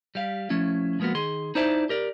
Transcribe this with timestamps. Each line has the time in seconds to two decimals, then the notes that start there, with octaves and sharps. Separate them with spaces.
0.15 G3 G4 F5
0.50 F3 A3 C#4 E4
1.00 F3 G#3 A#3 B3 F#4
1.15 D#3 G#4 C6
1.55 D#4 E4 C5 D5 E5 A5
1.89 G4 A#4 D5